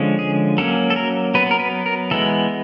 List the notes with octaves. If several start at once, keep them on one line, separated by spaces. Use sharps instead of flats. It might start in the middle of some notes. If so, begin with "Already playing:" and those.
Already playing: D3 F3 G#3 C#4
G#4
F#3 A#3 C#4 A4
A4
A#4
F#3 B3 B4
A#4
B4
A#4
E3 G#3 B3 A4